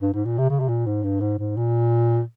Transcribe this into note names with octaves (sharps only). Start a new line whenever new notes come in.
G2
G#2
A#2
C3
C#3
C3
A#2
G#2
G2
G#2
G#2
A#2